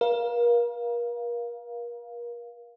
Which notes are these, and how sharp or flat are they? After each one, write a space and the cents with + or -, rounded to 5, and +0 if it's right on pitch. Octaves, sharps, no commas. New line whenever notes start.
A#4 +35 F5 +0